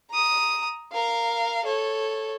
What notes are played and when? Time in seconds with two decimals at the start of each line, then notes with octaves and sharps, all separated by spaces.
0.10 A#5 D#6
0.93 A#4 F5
1.65 A4 C#5